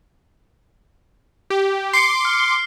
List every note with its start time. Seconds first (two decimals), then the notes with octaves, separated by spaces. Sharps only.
1.50 G4
1.93 C6 D6 C7 C#7
2.25 F6